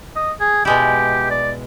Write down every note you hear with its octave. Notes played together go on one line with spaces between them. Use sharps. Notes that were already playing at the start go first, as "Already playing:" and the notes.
D#5
G#4
B2 G#3 E4 G4
D5